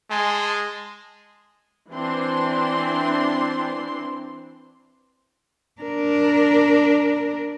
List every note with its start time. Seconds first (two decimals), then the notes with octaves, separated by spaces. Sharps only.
0.11 G#3 G#5 A5 C6
1.92 E3 C4 D4 C6
5.81 D4 A#4